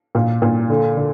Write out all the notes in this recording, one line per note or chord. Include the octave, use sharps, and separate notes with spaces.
A#2
A#2
D3
D3